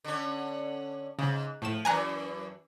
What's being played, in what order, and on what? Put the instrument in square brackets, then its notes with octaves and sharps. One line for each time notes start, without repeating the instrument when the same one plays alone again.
[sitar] D3 C#4
[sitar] G#2 [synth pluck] C#3
[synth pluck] A2 E7 [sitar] F3
[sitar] F#2 E3 [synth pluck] G#5 A#5 F#6